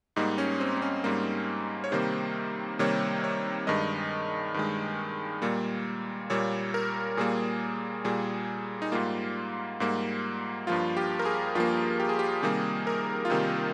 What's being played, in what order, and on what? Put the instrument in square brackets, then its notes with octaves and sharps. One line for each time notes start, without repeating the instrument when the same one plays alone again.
[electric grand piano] G#2 G3 A#3 D#4
C#4
C4
C4
C#4
G#2 G3 A#3
C#5
C3 D#3 G3 A#3 C5
C3 D#3 G3 A#3 C#5
C#5
G2 D#3 G#3 D#5
G2 D#3 G#3
A#2 G3 A#3
A#2 G3 A#3 C#5
A#4
A#2 G3 A#3 G#4
A#2 G3 A#3 G#4
D#4
G#2 G3 A#3 F4
G#2 G3 A#3
G2 F3 A#3 F4
G4
A#4
G#4
G2 F3 A#3 F4
G4
G#4
G4
C3 D#3 G3 A#3 G#4
A#4
F4
C3 D#3 G3 A#3 D#4